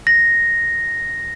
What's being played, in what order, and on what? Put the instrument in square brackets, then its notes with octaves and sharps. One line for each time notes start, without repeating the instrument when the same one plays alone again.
[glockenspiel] A#6